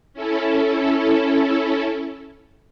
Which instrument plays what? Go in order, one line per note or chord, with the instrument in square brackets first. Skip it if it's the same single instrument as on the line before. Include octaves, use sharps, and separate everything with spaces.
[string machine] C#4 E4 A4